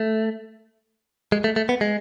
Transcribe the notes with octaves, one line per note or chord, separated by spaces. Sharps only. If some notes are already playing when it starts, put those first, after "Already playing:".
Already playing: A3
G#3
A3
A3
B3
G#3